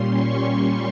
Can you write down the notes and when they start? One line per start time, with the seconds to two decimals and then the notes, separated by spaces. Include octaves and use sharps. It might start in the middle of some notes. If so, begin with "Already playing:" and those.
Already playing: A#2 G3 C#4 C6
0.13 C#6